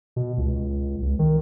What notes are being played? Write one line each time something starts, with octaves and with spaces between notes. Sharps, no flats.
B2
C#2
C#2
D#3